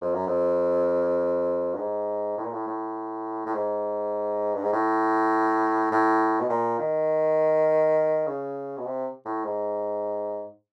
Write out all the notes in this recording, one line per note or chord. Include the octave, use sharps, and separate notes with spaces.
F2
F#2
F2
G2
G#2
A2
A#2
A2
A2
A2
G#2
G2
G#2
A2
A2
B2
A#2
D#3
C#3
B2
C3
A2
G#2